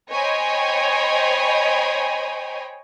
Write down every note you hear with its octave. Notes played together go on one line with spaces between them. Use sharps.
C5 C#5 D#5 G5 G#5 B5